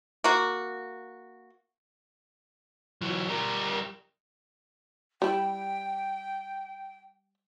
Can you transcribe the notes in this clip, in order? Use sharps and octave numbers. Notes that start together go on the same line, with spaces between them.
A#3 F#4
E3 F#3
G3 A#4
G3 E4 G5